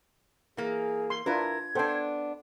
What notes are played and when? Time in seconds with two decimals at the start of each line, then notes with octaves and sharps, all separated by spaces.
0.57 E3 A#3 G#4
1.10 C6
1.26 D4 E4 F4 A#4 B4 G#6
1.75 B3 D4 A4 C5 G5